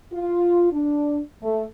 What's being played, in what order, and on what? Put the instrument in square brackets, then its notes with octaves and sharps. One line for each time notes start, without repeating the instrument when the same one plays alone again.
[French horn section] F4
D4
A3